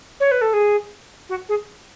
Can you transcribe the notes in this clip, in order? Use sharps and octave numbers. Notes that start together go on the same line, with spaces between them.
C#5
B4
A4
G#4
F#4
G#4